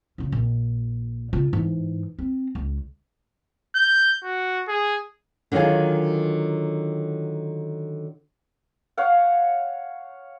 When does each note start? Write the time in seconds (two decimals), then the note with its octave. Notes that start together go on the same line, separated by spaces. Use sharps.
0.18 F2 C#3
0.32 A#1
1.33 C#3 F4
1.53 G#2 E3
2.19 C4
2.55 C#2
3.75 G6
4.24 F#4
4.68 G#4
5.52 D3 D#3 F#3 F4 G#4
8.97 C#5 F5 F#5